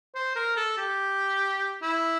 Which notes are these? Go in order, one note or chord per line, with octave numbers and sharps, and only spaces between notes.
C5
A#4
A4
G4
E4